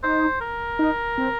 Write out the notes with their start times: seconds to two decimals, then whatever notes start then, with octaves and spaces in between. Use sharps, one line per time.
0.03 D#4 C5
0.41 A#4
0.79 D#4
1.18 C4